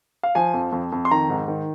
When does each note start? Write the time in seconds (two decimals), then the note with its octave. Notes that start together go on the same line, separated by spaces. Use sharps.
0.23 F5
0.35 F3 G#5
0.54 F2
0.72 F2
0.92 F2
1.05 C6
1.11 D#3 A#5
1.30 G#2
1.48 D#3